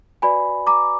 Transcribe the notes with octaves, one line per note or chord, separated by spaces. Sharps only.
F#4 B4 D5 G#5 B5
A#5 D6